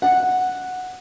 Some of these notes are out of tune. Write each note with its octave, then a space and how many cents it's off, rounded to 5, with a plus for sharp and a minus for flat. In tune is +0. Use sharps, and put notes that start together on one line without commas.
F#5 -5